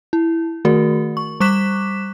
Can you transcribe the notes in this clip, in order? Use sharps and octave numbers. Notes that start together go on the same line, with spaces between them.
E4
D#3 A3 F#4 A#4
C#6
G3 C#6 D6 F#6 B6 E7